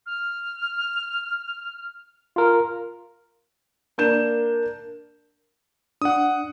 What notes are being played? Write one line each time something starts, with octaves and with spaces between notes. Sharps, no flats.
F6
F4 A#4
A#3 D4 G6 E7
D4 F#5 D#6